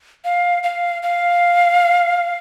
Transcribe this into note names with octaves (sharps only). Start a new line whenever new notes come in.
F5
F5
F5